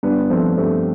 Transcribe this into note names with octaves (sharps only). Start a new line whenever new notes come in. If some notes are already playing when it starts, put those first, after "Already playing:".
G2 B3 D4
F3 A3 C4
G2 A3 C4